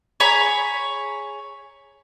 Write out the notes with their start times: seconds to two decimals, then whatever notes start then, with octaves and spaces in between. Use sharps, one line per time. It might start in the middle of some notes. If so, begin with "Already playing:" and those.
0.20 G#4 C#5 A#5 B5